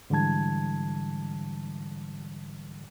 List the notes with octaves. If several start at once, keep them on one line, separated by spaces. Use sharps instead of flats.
G#2 D3 E3 G3 A5 G#6